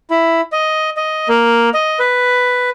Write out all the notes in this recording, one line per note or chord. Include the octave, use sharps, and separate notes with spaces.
E4
D#5
D#5
A#3
D#5
B4